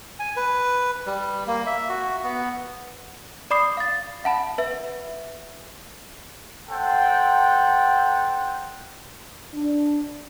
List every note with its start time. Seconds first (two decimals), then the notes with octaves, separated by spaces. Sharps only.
0.19 G#5
0.36 B4
1.06 G3
1.47 A#3
1.66 E5
1.89 F#4
2.24 B3
3.51 D5 B5 D6 D#6 C7
3.77 F5 A6
4.24 E5 F#5 A5 B5
4.58 B4 E5
6.69 A4 C5 F#5 G5
9.54 D4